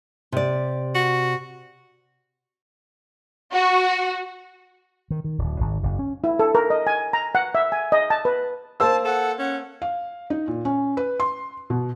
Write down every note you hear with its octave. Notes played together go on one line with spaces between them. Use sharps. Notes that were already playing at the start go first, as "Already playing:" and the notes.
C3 D5
F#4
F#4
D#3
D#3
D1
G#1
F#1
C#4
E4
A4
A#4
D#5
G#5
A#5
F#5
E5
G#5
D#5
A5
B4
A#3 C5 A5 E6
A4 F#5
C#4 F#5
F5
D#4
A#2
C#4
B4
C6
B2